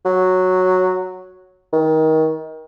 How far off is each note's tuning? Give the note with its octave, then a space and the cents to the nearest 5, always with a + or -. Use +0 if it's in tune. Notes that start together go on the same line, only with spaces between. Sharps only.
F#3 -5
D#3 +25